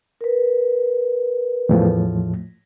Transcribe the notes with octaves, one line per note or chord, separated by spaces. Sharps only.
A#4 B4
E2 A2 F3